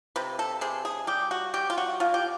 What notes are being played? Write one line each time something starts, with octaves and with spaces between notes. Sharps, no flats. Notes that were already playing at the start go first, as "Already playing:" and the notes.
C3 B4
A4
C3 G#4
G#4
G3 G4
F#4
G3 G4
F4
F#4
B2 F4
G4